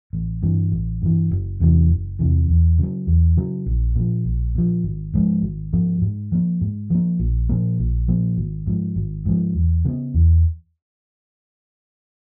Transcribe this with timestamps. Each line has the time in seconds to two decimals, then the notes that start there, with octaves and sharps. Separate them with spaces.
0.13 A1
0.43 G2 E3
0.72 A1
1.02 G2 E3
1.31 F#1
1.60 E2 C3 E3
1.90 F#1
2.19 E2 C3 E3
2.49 E2
2.79 C#3 F#3
3.07 E2
3.37 C#3 F#3
3.66 A#1
3.96 A#2 F3
4.25 A#1
4.55 A#2 F3
4.84 G#1
5.14 G#2 F3 G#3
5.42 G#1
5.73 G#2 F3 G#3
6.02 G#2
6.32 F3 A#3
6.61 G#2
6.90 F3 A#3
7.19 A#1
7.49 A#2 F3 A#3
7.79 A#1
8.08 A#2 F3 A#3
8.37 G#1
8.66 G#2 F3
8.96 G#1
9.25 G#2 F3
9.55 E2
9.85 C#3 F#3
9.88 B3
10.14 E2